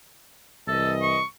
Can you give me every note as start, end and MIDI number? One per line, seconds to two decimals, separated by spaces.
0.68 1.19 36
0.68 1.19 52
0.68 0.92 69
0.68 1.19 75
1.02 1.25 85